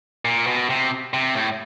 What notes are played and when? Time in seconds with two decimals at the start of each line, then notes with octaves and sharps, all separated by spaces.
0.25 A#2
0.47 B2
0.70 C3
1.14 C3
1.35 A2